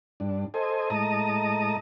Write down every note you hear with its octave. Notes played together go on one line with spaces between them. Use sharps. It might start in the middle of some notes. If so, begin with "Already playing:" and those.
G2 D4
A4 C5 D#5 G#5
A2 G#3 D#5 A5 A#5 D#6